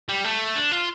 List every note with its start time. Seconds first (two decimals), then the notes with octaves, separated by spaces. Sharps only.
0.09 G3
0.24 A3
0.56 D4
0.72 F4